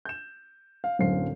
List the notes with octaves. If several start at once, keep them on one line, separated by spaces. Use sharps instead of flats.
G6 E7
F5
D1 F#2 D3 C5 F5 C7